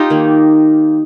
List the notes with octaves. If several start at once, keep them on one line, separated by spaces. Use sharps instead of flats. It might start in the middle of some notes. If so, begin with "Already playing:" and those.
Already playing: D#4 F4 G4
D#3 A#3